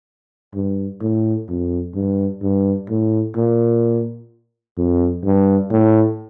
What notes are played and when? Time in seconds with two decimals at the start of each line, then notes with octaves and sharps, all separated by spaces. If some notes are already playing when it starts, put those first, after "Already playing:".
0.54 G2
1.01 A2
1.49 F2
1.95 G2
2.42 G2
2.90 A2
3.36 A#2
4.77 F2
5.25 G2
5.71 A2